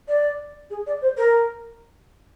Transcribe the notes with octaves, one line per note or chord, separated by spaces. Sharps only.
D5
G#4
D5
C5
A#4